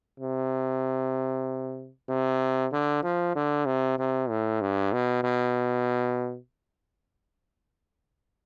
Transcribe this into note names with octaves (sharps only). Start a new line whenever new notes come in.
C3
C3
D3
F3
D3
C3
C3
A2
G2
B2
B2